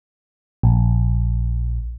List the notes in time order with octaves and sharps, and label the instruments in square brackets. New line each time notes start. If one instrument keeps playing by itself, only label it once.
[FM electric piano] A#1